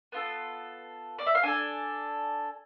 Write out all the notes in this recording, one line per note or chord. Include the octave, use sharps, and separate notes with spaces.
B3 F4 A4
D5
E5
F5
D4 A4 G#5